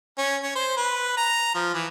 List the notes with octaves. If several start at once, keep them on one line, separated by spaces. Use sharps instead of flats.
C#4
C#4
C5
B4
A#5
F3
E3